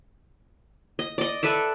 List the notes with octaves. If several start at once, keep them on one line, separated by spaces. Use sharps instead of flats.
D#5
D5 D#5
A4 B4 D5 E5